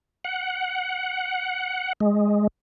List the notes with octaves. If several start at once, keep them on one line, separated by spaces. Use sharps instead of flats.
F#5
G#3